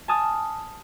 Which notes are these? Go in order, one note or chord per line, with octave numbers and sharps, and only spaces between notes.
G#5 A5 D#6 F6